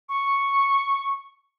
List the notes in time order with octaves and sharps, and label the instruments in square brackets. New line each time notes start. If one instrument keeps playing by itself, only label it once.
[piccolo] C#6